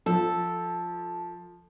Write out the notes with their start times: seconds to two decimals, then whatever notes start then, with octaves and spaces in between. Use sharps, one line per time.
0.06 F3 A4